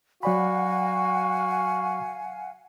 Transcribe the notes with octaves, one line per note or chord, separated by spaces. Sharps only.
F#3 F#4 D5 F5 F#5 G#5 B5